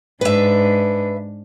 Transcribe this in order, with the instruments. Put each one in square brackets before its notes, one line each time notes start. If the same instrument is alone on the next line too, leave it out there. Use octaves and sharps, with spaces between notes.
[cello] G#2 D4 [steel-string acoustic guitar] B4 E5